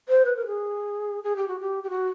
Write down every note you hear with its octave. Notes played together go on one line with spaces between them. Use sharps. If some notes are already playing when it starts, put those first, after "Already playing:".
C5
B4
A#4
G#4
G#4
G4
F#4
G4
G4
F#4